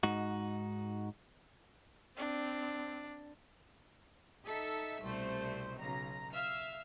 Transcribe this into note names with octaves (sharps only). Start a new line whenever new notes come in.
G#2 D#4 F#4
C4 D4
D#4 A4 E5 E6 B6
C2 B2 A3 C5
B1 C#3 A#5
E5 F5 F6